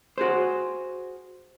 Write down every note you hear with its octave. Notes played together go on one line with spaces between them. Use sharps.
F#4 G#4 C5